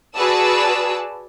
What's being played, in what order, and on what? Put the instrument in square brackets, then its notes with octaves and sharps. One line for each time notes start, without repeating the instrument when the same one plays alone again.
[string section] F#4 G#4 B4 D5 A5 E6